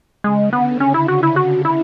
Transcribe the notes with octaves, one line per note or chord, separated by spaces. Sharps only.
C#3 G#3
D3 B3
C#4
E4
F#4
E4
F#4
E4